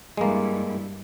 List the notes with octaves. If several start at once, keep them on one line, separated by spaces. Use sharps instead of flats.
G2 G#3 A#3 E4